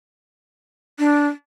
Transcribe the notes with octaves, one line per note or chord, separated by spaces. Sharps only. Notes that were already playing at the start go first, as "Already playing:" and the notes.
D4